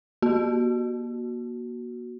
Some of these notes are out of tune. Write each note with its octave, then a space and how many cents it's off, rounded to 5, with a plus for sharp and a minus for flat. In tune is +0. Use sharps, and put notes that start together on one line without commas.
A#3 +40 F#4 +0